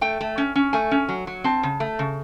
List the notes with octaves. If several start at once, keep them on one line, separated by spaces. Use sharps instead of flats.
A3 G5
A3
C#4
C#4
A3 G#5
C#4
F#3
F#3
C4 A5
C#3
A3
C#3